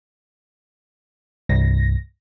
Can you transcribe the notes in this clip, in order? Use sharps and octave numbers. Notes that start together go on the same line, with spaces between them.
C2 G2 A#6